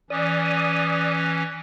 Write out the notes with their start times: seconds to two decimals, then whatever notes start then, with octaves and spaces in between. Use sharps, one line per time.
0.10 E3 C#4 D5 D#6